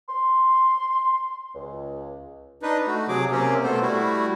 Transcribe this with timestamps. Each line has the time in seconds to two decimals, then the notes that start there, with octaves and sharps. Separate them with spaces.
0.09 C6
1.55 C#2
2.62 D4 D#4 B4
2.87 A3 F#4
3.08 C3 F#3 G#4 D6
3.32 C3 A#3 C4 C#4 G4
3.63 B2 A3 B3 A4 C5
3.82 G3 A3 E4 F#4